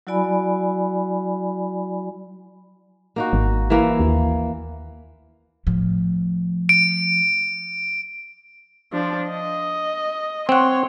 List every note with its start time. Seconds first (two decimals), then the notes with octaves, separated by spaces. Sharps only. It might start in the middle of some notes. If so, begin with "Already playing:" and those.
0.07 F#3 E4 F#4 D5 G#5 B5
3.16 A#3 D#4 F#4
3.33 G#1
3.70 E3 A#3 E4
4.00 D#2
5.67 A2 F3
6.69 D7
8.92 F3 D4
9.30 D#5
10.49 C4 C#5 F#5 C6